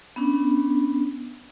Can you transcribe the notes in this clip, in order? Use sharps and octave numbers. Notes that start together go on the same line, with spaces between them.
B3 C#4 D4